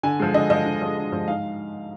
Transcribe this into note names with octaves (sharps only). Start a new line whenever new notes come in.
D3 G#5
F3 G#3
D3 D#5
F3 G#3 D#5
D3
F3 G#3
D3
F3 G#3
G#2 F5